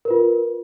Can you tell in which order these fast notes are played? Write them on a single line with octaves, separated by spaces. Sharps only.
A#4 B4 F4